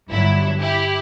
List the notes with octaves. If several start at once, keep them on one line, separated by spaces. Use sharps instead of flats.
G1 G2 F#3 E4
E4 G4